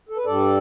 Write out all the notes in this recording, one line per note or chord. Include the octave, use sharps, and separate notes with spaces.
A4
B4
G2 G3 A4 D5